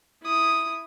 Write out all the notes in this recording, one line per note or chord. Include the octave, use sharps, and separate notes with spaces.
E4 D#6